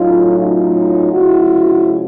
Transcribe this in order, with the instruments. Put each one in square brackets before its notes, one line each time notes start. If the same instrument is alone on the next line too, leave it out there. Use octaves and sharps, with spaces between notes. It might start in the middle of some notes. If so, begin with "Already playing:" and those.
Already playing: [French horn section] A2 F#3 A3 C#4 D#4 F4
D#4 F4
C3 F3 G#3 C#4 E4 F#4